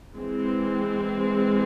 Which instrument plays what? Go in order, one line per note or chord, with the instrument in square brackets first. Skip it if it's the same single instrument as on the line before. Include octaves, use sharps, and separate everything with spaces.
[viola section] E3 G#3 C4